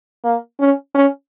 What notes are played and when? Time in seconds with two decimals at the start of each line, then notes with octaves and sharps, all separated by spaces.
0.24 A#3
0.60 C#4
0.95 C#4